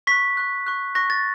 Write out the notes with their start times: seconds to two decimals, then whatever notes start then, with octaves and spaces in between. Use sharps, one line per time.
0.07 C#6 F#6 B6
0.37 C#6 F#6
0.66 C#6 F#6
0.95 C#6 F#6 A#6
1.10 A6